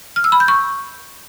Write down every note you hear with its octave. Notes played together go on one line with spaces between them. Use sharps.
F6
E6
B5
G6
C#6